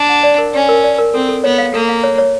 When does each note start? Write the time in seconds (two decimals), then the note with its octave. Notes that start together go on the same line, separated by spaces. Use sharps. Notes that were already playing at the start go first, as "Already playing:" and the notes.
Already playing: D4
0.09 F#5
0.23 D5
0.38 A#4
0.53 C#4 D5
0.69 A#4
0.84 D5
0.98 A#4
1.14 C4 A4
1.29 A4
1.44 B3 C#5
1.58 F5
1.74 A#3 A4
1.88 F5
2.04 C#5
2.18 C#5